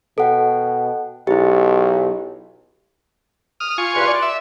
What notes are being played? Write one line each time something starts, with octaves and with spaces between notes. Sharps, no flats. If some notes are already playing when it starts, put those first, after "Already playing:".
B2 A4 F#5 G5
B1 E4 G4
D#6 F6
F4 G#5 C#6
E2 G2 B4 C6
D5
E5